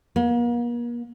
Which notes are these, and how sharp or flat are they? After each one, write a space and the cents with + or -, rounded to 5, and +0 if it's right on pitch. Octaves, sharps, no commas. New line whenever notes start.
A#3 +40